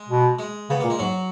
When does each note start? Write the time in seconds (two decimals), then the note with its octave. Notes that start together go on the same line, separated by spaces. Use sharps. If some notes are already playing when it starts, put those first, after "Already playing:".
Already playing: G#3
0.09 B2
0.39 G#3
0.69 C#3 B3
0.81 A#2 A#3
0.90 G#3
0.99 G#2 F#3